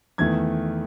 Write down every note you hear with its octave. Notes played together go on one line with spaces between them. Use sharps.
E2 D#3 A3 G#6